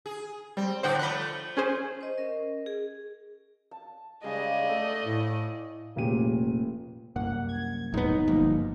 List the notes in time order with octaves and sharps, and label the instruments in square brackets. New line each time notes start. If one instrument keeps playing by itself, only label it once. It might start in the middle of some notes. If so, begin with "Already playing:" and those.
[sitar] G#4
[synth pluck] G3 [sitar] C4
[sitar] A2 D3 D5 [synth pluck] C5 F#5 G5
[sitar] F3 A3 [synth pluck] B5 F#6
[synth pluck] C#4 G#4 C5
[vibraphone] C5 D#5
C#4 A#4 D#5
G#4
[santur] A5
[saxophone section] C#3 G3 G#3 [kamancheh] D5 D#5 [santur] F5 G#5
[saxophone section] A3
[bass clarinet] A2
[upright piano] F1 A#2 C#4 G4 G#4 D#7
[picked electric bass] C2 F#2 A#3 [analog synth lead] F#5
[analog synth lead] G#6
[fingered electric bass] D#1 B3 [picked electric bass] A2 F#3 G#3 [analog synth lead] D#4
[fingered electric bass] G1 [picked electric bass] B2 F3 A#3